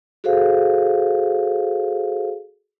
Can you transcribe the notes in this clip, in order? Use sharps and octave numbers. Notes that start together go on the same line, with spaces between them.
F#4 G#4 A4 C5 F5